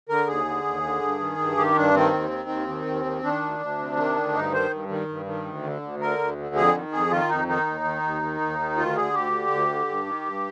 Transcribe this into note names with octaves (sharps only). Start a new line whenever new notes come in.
D3 A#4
D#2 G#4
D3
D#2
D3
G2
D#3
G2
D#3 G4
G2 D4
D#3 C4
D#2
D#3
D#2
D#3
D#2
D#3
D#3 D4
D2
D2
C3
D#3
D2
G2 D#4
D#3 C5
G2
D#3
G2
D#3
D2
D3
D2
D3 A#4
D2
D3
F2 G#4
D#3
F2 G#4
D#3 F4
F2 D#4
D#3 D#4
D#2
D#3
D#2
D#3
D#2
D#3
D2 F4
D3 G#4
D2 G4
D3
D2
D3
G2
D#3
G2